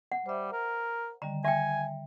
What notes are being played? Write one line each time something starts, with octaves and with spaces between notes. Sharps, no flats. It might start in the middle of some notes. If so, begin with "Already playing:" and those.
F#5
G3 C5 E5
A#4
D3 D#3 G3 A#5
E5 G5 G#5